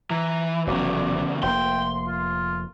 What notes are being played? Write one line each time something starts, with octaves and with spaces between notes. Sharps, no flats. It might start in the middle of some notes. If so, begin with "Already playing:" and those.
E3 A#5
F1 E2 G#2 C#3 F#3 D5
F1 A#3 G5 C6
F4